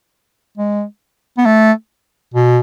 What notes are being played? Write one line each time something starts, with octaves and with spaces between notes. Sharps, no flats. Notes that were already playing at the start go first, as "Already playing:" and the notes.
G#3
B3
A3
B2